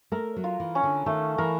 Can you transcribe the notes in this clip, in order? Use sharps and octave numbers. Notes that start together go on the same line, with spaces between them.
A3 A#4
F#3
F4
E3
C#4
D3
D#3 A3
E3 A#4